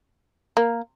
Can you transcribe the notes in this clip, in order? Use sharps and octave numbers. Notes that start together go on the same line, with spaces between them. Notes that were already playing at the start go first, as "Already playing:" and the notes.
A#3